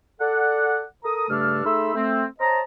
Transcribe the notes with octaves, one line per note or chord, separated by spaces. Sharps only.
A4 D5 F#5
A4 A#4 A#5 D#6
G2 C#3 A3 D4 A4 F6
A3 D#4 G#4 B5 C6 E6
A3 C4
C5 C#5 D#5 A5 A#5